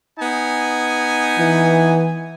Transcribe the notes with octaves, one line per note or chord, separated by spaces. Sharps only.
B3 D#4 G#5
E3